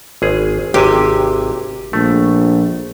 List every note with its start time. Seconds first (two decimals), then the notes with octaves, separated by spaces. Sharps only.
0.22 G#1 G#4
0.74 G#1 C3 G4 G#5
1.93 A#1 A3